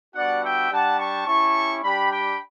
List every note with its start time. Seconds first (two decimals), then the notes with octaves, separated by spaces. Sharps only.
0.15 G3 B3 D4 F#4 D5 F#5
0.42 E5 G5
0.70 G3 D4 G4 F#5 A5
0.99 A5 C#6
1.27 C#4 E4 G4 A5 C#6
1.83 G3 D4 G4 G5 B5
2.11 G5 B5